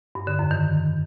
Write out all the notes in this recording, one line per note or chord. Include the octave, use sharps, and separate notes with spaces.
G2
D3
F2
D#3